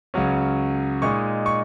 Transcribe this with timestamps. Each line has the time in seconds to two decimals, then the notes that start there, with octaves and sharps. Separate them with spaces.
0.14 C#2 C#3 F#3 C#4
1.02 A#2 G#3 D#4 C#6
1.46 C#6